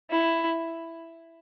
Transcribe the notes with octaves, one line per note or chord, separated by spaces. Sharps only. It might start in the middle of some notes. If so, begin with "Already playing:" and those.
E4